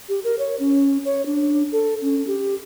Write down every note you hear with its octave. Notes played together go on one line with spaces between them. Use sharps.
G4
A#4
C#5
C#4
C#5
D4
A4
C#4
G4